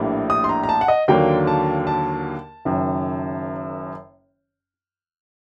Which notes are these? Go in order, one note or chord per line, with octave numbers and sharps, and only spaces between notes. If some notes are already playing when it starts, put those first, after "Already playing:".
Already playing: A#1 A2 G3 A#3 D4
D#6
C6
A#5
A#5
A5
F#5
D#5
D#2 D3 F#3 A#3 G5
A5
A5
F#1 F#2 D#3